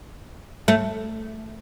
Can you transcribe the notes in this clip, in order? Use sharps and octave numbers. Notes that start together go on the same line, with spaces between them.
A3